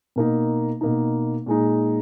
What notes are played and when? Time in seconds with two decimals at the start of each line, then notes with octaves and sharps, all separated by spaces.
0.16 B2 A#3 D#4
0.81 B2 A#3 D#4
1.46 A#2 G#3 D#4